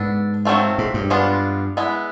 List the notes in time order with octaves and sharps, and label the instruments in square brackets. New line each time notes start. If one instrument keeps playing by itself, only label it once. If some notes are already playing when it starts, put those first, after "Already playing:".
Already playing: [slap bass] G#2 [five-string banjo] B3 D4 A4
[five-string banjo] D#3 F#3 A3 C4 F4
[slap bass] G#2
G2
[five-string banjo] G#3 B3 D4 F4
G#3 B3 E4